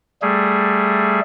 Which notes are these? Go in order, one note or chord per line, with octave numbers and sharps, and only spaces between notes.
G3 A3 G#4